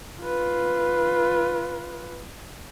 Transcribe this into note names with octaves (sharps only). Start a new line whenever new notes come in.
F4 B4